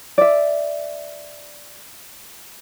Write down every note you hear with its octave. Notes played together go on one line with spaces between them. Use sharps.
D5 E5